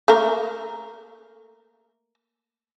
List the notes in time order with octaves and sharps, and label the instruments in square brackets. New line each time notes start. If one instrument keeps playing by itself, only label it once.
[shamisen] A3 A#3 A#4